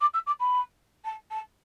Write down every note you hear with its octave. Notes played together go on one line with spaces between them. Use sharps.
D6
E6
D6
B5
A5
A5